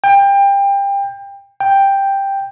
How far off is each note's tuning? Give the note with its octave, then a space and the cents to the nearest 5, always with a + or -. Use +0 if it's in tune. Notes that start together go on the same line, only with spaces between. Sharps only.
G5 +25
G5 +5